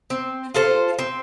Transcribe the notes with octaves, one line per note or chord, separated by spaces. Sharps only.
C4
F4 A4 C5
C4